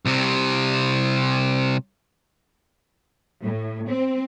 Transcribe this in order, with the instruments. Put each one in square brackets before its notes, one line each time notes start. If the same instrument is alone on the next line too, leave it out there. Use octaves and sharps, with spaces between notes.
[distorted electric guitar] C2 C3
[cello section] A2
C4